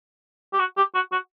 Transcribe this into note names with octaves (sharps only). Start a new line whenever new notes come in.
G4
F#4
G4
F#4
F#4